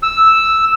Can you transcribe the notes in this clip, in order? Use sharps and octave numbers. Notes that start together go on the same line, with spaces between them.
E6